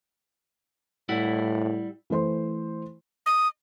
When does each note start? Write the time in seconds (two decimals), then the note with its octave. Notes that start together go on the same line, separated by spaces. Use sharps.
1.09 A2 G3 E4 F#5
2.10 E3 A3 C5 C6
3.26 D#6